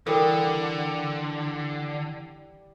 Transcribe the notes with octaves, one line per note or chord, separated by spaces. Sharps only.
D3 E3 G3 A4 A#4 D5